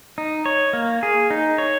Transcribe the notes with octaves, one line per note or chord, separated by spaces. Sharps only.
D#4
C#5
A#3
G#4
D#4
C#5